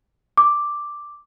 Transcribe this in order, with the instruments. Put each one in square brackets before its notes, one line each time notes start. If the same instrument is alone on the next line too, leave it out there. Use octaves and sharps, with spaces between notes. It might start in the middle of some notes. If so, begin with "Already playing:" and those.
[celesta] D6